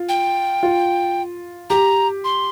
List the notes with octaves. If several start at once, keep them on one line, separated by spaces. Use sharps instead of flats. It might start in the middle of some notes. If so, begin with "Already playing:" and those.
Already playing: F4
G5
F4
G4 A#5
C6